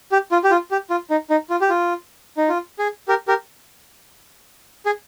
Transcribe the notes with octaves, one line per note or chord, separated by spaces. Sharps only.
G4
F4
G4
F4
G4
F4
D#4
D#4
F4
G4
F4
D#4
F4
G#4
G4 A#4
G4 A#4
G#4